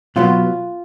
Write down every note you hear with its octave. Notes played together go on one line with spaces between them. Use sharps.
B2 F#3 B3 F4